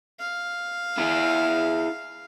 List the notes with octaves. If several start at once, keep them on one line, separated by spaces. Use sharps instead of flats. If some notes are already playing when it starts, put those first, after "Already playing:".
F5
E4 G#4